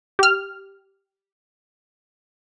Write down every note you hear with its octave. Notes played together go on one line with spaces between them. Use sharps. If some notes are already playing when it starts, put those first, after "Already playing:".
G4 F6